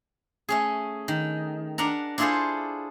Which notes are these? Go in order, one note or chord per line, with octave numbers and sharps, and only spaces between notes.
A3 C#4 G#4
D#3
D4 A#4 F#5 A#5
D4 E4 F4 G#4 A4 C5